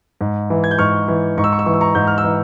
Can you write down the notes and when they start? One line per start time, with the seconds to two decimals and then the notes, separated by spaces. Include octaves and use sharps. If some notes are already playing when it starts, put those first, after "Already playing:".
0.21 G#2
0.50 E3
0.64 G#6
0.71 G6
0.78 G#2 C#6 F6
1.08 E3
1.38 G#2 C#6
1.44 E6
1.52 C#6
1.59 E6
1.66 E3 C#6
1.74 E6
1.81 A#5 C#6
1.95 G#2 G6
2.08 F6
2.18 E6
2.24 E3